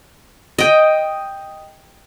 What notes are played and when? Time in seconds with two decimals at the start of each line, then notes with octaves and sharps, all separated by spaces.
0.58 D#5 G5